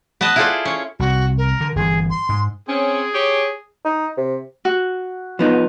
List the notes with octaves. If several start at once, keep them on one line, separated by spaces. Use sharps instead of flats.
B3 B4 D#5 A5
E4 F4 G#4 A4 C5 D5
C#4 C#5
C2 F#4
A#4
D3
G1 A#2 E3 G#4
C6
G#2
C4 C#4 G#4
G4 C#5
D#4
C3
F#4
F3 B3 D#4